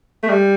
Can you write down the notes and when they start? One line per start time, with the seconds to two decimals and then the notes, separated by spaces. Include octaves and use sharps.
0.23 A3
0.29 G3